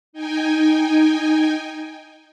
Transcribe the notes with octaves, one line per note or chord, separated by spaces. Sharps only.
D#4 G5 G#5